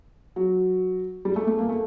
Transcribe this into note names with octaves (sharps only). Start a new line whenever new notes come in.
F#3
G3
A3
A3
A#3
A3